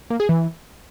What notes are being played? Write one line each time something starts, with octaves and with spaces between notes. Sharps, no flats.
A#3
G#4
E3